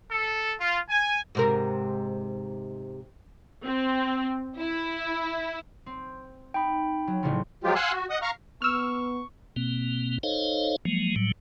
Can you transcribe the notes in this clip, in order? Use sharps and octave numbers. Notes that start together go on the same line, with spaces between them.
A4
F4
G#5
G#2 C3 A#4
C4
E4
C4
D#4 G5 B5
F#3
A1 C#3 F3
F3 F#3 G#3 F4 G4
F5 F#5 G#5 C6 E6 F#6
F#4
D#5 F#5 D#6
F5 A#5 C#6 F6
B3 C#6 E6 F6
B2 A#3 C4
D#4 A4 C5 C#5 D#5 F5
F3 F#3 G#3 A#3
A2 F#3 G3